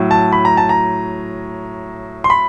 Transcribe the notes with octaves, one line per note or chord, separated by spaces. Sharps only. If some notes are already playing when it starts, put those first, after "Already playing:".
Already playing: A2 F#3
A5
B5
A#5
A5
A#5
C6
B5